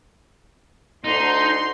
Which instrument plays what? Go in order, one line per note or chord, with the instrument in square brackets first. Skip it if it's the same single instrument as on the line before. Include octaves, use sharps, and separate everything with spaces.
[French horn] D2 [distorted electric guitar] D#4 [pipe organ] C6